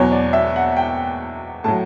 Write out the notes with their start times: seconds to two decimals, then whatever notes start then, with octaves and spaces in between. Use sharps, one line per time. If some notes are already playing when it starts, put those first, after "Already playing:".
Already playing: E2 B2 F#3 C#5
0.12 D5
0.33 E5
0.56 F#5
0.76 G5
1.64 A2 F#3 A5